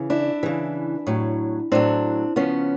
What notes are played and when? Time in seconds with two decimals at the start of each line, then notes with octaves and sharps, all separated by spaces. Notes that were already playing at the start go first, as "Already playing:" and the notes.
Already playing: C#3 E3
0.10 D4 E4
0.43 C#3 E3
1.07 A2 F#3
1.72 A2 F#3 C4 D4
2.36 C#3 F3 B3 C#4